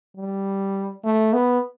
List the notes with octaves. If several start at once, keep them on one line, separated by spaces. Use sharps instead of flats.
G3
A3
B3